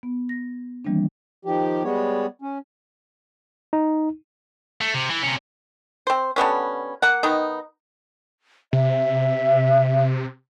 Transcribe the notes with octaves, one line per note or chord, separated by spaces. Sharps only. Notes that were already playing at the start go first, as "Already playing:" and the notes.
B3
A#6
D#3 E3 G3 A#3 C4 D4
D#3 F3 G4
G3 G#3 B3 C#5
C#4
D#4
A3
C3
E3
C3 C#4
C4 C5
D3 G3 B3 C#4
A#3 F#5
D#3 B3 D#4
C3 E5